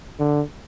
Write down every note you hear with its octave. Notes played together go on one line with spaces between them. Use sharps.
D3